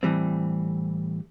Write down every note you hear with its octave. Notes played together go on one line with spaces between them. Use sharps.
A2 E3 G3 C4